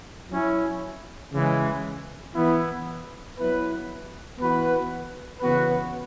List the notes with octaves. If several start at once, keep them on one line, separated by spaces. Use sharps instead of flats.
F#3 C#4 E4
C#3 E3 G#3
E3 B3 E4
F#3 B3 E4 B4
E3 B3 F#4 B4
C#3 E3 B3 F#4 B4